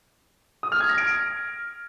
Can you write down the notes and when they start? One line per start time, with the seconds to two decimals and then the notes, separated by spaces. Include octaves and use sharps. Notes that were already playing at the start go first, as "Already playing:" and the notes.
0.63 D#6
0.72 F6
0.80 G#6
0.89 A#6
0.98 D7